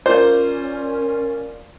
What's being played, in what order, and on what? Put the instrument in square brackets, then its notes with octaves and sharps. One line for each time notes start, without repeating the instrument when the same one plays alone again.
[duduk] C#4 [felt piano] F4 [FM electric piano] A#4 D5 [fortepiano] C5